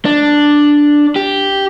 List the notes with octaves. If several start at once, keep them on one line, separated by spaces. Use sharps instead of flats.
D4
G4